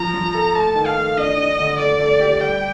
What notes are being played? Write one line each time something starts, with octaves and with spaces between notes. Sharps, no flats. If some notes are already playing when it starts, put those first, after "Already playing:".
Already playing: F3 A#5
F3
A4
A3 A5
D#3
F5
A3
D4 D#5
D4
D3
A3 D5
A3
G4
G3 G5